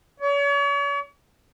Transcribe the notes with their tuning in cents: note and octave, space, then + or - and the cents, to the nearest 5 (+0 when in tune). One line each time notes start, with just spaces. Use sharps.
C#5 +40